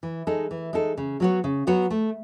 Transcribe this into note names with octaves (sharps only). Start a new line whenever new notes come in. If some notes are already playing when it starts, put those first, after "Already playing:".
E3
G#3 D#4 A4
E3
G#3 D#4 A4
C#3
F#3 B3 F#4 C#5
C#3
F#3 B3 F#4 C#5
A3